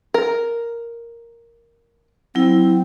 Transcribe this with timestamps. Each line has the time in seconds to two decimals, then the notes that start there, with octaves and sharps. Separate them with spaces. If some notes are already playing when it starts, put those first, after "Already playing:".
0.14 A#4
2.35 F#3 C4 E4